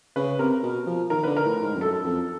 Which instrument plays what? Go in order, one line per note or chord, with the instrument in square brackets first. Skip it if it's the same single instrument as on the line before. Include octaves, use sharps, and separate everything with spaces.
[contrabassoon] C#3 [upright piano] B4
[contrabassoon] C3 [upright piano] A#4
[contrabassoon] B2
F3
[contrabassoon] D#3 [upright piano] A#4
[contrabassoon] D3 [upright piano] B4
[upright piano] A#4
[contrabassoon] A2
G#2
F2
[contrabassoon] F#2 [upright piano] A4
[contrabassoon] F2